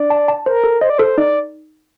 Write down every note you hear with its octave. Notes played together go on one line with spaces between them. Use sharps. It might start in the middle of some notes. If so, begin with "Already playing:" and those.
Already playing: D4 D5
A5
A5
A#4 C5
A4
C5 D#5
D5
A4 C5
D#4 D5